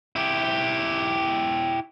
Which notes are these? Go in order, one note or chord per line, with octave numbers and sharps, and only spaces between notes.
E4 G4